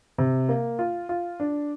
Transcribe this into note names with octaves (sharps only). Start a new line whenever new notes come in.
C3
A#3
F4
F4
D4